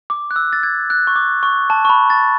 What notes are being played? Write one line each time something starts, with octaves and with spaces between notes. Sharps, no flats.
D6
F#6
E6
A6
G#6
F#6
C#6
D6
C#6
A5
C#6
B5
A6